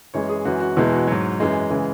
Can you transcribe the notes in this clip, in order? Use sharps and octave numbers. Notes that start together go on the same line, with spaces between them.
F#2 E3 G#3 C#5
G#4
F#2 E3 G#3 F#4
F#4
E2 B2 G#3 E4
F#4
G#2 F#3
F#2 E3 G#3
C#3 E3 G#3